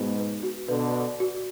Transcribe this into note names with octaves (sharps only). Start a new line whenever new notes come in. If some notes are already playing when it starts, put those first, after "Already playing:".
Already playing: G#2 B2 B3
B4
F#4
B2 D3 B4
D5
F#4